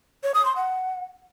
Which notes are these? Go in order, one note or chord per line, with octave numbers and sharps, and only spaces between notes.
C#5
D#6
C6
F#5